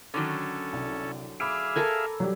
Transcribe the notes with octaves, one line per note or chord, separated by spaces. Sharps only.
D3 D#3 F#3 C#4 A4
C2
G#4 E5 F5 B5 D6 D7
A4 A#4 G#5
F#3 G3 G4